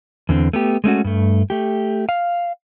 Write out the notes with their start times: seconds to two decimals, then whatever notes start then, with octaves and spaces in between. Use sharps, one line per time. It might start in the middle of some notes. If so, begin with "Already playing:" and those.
0.29 E2 D3 C4
0.53 A3 B3 G4
0.84 G#3 A3 C#4 F#4
1.04 G2 A3
1.50 A3 G4
2.09 F5